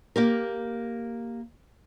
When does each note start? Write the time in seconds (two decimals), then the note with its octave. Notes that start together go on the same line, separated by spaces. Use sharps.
0.16 A#3 G4 A#4